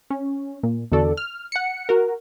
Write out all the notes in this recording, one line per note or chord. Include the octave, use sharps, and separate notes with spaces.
C#4
A#2
E2 D3 F#4 A4 D5
F6
F#5 C#7
F#4 A#4